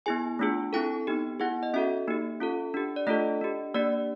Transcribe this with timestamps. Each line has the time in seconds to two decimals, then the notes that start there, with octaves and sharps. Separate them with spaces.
0.06 B3 E4 G#4 G#5
0.39 A3 D4 F4 G#4
0.73 C4 E4 A4 G5
1.07 B3 D#4 G4
1.40 B3 E4 G#4 F#5
1.63 D#5
1.74 C#4 F#4 A4 E5
2.08 A#3 D#4 G4
2.40 C#4 F4 A4
2.74 D4 G4
2.96 D5
3.07 A3 D4 F4 A4 D#5
3.41 D4 G4
3.74 A#3 D4 G4 D5